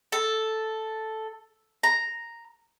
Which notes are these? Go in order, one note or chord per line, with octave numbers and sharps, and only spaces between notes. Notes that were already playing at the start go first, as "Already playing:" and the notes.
A4
A#5